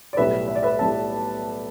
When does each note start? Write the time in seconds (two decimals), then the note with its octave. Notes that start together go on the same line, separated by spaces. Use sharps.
0.13 D5
0.17 B1 A2 G3 B4 E5
0.48 E5
0.55 D5
0.63 B4 E5
0.79 A2 G3 E5 A5